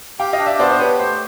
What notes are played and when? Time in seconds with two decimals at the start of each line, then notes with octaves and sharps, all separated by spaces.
0.19 G4 F5 G5
0.33 D#5 F5
0.39 D4
0.46 D5 E5
0.59 B3 C5 D5
0.70 C5
0.79 G4 B4 C#5
0.99 A3 C5